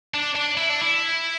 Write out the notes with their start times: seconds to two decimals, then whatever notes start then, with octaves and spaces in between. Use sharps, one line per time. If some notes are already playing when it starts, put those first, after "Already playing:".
0.14 D4
0.35 D4
0.57 E4
0.70 D4
0.82 E4